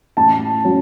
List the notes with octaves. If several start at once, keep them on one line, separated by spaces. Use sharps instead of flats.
A1 A5
F#3 C#4